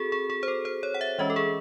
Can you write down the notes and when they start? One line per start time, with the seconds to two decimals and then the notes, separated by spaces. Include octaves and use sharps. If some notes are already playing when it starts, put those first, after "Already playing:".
Already playing: C4 F#4 G#4 A4
0.12 G#4
0.30 G#4
0.43 C5
0.48 A4
0.65 C5
0.83 C#5
0.94 F#5
1.01 E5
1.19 E3 G#3 C#4 D#5
1.30 A4
1.36 G#4